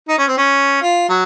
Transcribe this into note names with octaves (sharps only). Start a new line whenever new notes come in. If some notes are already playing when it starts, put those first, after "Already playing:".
D#4
C#4
C4
C#4
F4
F#3